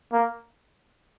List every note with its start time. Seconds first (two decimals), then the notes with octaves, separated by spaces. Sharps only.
0.13 A#3